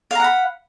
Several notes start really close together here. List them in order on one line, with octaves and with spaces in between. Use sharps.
F5 A#5 F#5 B5